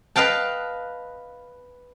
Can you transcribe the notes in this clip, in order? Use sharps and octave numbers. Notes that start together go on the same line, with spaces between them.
B4 D#5 F5 G5 A5